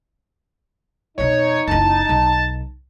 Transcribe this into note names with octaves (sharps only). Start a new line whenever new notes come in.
F2 B2 D#4 C#5
F#1 E4 A5
B1